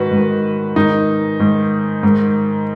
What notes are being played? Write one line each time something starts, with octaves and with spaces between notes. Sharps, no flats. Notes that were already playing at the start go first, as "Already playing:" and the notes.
Already playing: G#2 D#3 F#4 B4
G#2 D#3
G#2 D#3 D#4
G#2 D#3
G#2 D#3